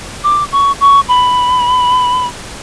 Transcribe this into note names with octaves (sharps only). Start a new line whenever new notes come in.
D6
C#6
C#6
B5